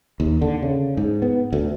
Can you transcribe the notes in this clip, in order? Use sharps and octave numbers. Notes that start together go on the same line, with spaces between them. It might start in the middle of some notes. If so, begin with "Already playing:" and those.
D#2
D3
C#3
G#2
B3
D2